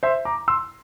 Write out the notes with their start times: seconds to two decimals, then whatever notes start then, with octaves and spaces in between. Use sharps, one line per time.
0.03 C5 E5
0.25 A#5 D6
0.48 C6 E6